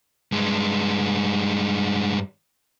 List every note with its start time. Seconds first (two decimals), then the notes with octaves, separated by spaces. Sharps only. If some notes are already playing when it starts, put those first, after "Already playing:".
0.32 G2 G#3